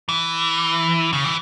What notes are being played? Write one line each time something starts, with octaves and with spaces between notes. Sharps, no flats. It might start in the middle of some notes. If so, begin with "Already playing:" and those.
E3
C#3
E3